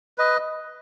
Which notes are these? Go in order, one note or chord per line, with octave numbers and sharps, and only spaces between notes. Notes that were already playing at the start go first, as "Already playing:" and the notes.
B4 D#5